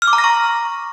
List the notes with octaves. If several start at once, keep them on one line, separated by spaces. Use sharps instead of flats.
F6
D6
A#5
A#6
C#6